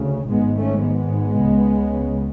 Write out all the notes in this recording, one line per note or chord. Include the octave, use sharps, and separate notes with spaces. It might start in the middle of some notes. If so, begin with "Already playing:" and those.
Already playing: D2 C#3
G#1 G#2 G#3 B3
A3 C#4
G#3 B3
C#2 C#3